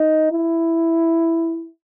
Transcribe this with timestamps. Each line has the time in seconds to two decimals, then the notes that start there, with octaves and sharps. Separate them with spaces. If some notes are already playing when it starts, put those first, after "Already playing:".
Already playing: D#4
0.32 E4